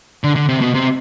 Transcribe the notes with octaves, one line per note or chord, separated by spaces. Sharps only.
D3
D3
C3
B2
C3